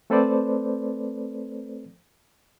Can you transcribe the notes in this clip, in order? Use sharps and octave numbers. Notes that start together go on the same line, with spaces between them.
A3 C4 A4 B4 C5 D5